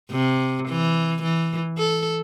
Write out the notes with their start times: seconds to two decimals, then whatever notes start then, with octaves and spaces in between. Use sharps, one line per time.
0.11 C3
0.68 E3
1.23 E3
1.78 A4